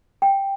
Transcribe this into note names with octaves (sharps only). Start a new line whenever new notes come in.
G5